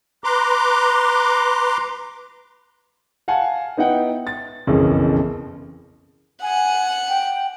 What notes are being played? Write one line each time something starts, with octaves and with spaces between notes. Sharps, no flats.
B4 A#5 C6 D6
F5 F#5 G#5 A5
B3 D#4 E4 F#5 G5
A6
F#1 B1 F2 C#3 E3
F#5 G#5
G5